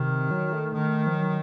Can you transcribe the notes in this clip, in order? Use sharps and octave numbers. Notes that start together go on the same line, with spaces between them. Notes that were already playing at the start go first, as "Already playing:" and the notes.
Already playing: C3 D#3
F#3
A3
D#3
F3
F#3